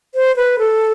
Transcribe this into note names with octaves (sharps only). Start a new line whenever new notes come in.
C5
B4
A4